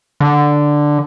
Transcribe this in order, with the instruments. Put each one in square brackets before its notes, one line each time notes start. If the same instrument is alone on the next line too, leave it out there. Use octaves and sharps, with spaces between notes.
[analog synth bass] D3